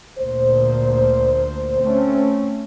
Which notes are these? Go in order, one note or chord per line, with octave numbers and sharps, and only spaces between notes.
D2 A#2 C5
A3 C4 C#4